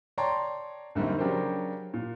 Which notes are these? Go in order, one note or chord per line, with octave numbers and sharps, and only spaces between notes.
C#5 D5 G5 A5 A#5 C6
F#2 D3 G3 A#3 C4 D#4
C#3 F#3 D4 G4 A#4 C5
A#2